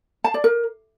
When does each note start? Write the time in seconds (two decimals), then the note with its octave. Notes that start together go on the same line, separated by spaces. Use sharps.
0.24 A5
0.34 D5
0.44 A#4